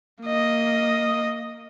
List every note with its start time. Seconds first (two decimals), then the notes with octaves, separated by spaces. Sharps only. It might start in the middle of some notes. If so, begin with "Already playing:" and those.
0.22 A#3 D#5